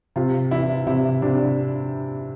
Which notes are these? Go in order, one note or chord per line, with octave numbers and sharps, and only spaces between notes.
C3 F4
E3 E4
C3 E4
C3 D4